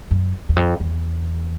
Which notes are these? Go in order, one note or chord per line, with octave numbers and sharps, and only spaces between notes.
F#2
E2
F2
E2